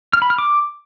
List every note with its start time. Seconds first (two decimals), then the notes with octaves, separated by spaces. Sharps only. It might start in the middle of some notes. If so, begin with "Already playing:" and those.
0.13 F6
0.22 B5
0.30 F6
0.38 D6